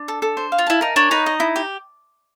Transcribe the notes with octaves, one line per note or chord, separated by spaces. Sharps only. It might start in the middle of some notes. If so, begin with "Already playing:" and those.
Already playing: D4
A4
A4
C5
F5
F4
E4 A5
D#4 A#4
D4 C#5
D#4 B4
D#5
E4
G4